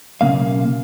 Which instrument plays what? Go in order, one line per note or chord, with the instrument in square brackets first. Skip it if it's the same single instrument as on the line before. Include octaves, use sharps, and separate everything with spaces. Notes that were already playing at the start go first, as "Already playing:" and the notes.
[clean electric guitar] B1 C#3 A#3 F5